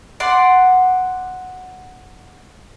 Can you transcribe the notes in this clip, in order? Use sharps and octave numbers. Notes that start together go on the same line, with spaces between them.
D5 F#5 C6